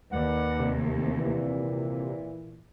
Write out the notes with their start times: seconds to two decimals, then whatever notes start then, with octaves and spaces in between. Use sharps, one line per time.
0.12 D#2 B4 D5 F#5
0.59 C3
1.17 A#2 E3